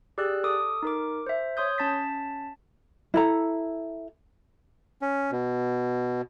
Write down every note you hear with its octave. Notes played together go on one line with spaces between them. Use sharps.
G4 G#4 D5 E6 F#6
A4 D6 D#6
D#4 A#4 D6
C5 E5
C#5 C6 D#6 G6
C#4 A5 A6 B6
E4 A4 A#5
C#4
B2